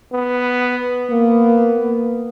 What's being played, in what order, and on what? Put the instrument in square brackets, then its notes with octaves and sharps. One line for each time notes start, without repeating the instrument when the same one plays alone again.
[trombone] B3
[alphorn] A#3 [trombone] B3